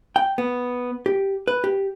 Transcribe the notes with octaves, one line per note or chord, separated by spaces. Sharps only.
G5
B3
G4
B4
G4